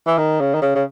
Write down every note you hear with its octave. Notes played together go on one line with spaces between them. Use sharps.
E3
D#3
C#3
D#3
C#3
C#3